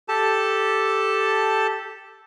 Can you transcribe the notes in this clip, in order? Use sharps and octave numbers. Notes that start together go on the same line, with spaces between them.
G4 A4 A5